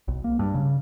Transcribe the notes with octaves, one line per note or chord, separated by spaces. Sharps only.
B1
A#3
G2
C#3